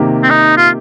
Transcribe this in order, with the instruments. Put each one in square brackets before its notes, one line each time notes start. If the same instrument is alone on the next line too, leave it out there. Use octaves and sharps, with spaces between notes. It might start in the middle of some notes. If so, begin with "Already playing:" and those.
Already playing: [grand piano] C3 D#3 A#3 G4
[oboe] C4
D#4
F4